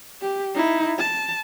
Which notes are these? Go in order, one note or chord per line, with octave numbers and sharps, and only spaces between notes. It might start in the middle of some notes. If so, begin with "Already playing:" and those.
G4
D#4 E4
A5